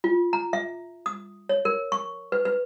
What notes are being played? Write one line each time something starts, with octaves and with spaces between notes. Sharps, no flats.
F4
A#5
E5
D#6
C#5
A#4
C#6
B4
B4